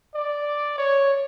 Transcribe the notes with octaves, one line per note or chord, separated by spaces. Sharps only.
D5
C#5